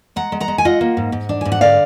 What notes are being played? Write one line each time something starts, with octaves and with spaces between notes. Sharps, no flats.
G#3 F#5 A#5
G#3
F#5 A#5
G#3
G#5
F4 D#5 F#5
A#3
G#2
G#2
D4
G#2 G#5
F#5
D3 D5 F5